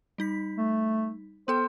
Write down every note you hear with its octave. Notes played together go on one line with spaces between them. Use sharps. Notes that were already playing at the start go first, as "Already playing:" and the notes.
G3 D#4 B6
A3
B3 A4 C5 G5